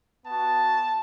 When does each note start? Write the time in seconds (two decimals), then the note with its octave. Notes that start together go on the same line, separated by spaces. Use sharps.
0.25 B3 F#4 A5